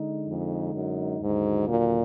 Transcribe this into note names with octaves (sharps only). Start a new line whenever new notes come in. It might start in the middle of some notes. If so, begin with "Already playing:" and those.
Already playing: D3 G#3 D#4
F2
F#2
D#2 G#2 D3 F#3 D4 F#4
A#2